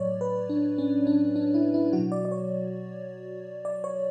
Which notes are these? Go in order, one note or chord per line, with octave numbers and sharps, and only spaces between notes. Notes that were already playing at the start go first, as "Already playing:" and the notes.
Already playing: A2 F#3 C#5 D5
B4
D4
C#4
D4
D4
E4
E4
B2 F#3 F#4
D5
D5
C#5
D5
C#5